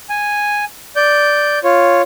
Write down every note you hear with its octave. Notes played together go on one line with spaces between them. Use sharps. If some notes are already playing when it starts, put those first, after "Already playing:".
G#5
D5 G6
F4 C#5